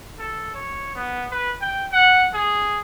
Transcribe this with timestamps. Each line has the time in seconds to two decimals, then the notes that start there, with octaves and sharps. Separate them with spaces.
0.19 A4
0.55 C#5
0.96 B3
1.31 B4
1.62 G5
1.93 F#5
2.34 G#4